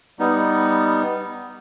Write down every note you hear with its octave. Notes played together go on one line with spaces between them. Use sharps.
G3 B3 D#4